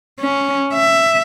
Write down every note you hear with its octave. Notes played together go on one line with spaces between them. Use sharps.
C#4
E5